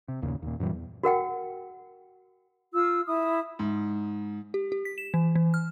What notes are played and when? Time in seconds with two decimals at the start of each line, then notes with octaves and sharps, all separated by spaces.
0.08 C3
0.22 G1 D#2 A#2 C#3
0.42 D#2 A#2
0.60 F#2 A#2 E3 G3
0.73 E2
1.03 F#4 A#4 F#5 G5
2.72 F4 E6
3.05 E4 D#6
3.59 G#2
4.54 G4
4.72 G4
4.85 B6
4.98 E7
5.14 E3
5.35 E3
5.54 F6